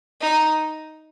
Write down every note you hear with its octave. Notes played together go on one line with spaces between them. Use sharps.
D#4